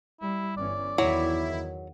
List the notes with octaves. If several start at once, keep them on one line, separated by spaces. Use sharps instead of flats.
G3 E4
G1 E3 C#4 D5
E2 D#3 F#3 E4